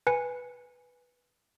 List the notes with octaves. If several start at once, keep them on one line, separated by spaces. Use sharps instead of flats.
B4 G#5 C#7